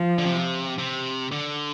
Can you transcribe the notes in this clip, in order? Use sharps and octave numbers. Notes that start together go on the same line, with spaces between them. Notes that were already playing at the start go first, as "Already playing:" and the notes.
Already playing: F3
D3
C3
C3
D3